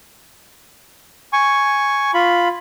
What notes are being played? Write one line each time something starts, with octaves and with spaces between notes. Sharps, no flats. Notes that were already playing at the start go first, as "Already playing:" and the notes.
G#5 C#6
F4 B5